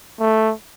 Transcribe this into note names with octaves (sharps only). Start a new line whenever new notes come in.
A3